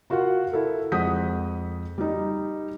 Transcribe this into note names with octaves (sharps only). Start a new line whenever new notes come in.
F4 F#4 A#4 F5 F#5
E4 A4 A#4
F2 G#3 F#5 D#6 G6 B6
G3 D#4